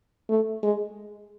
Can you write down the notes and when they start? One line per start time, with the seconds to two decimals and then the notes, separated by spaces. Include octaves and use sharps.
0.29 A3
0.63 G#3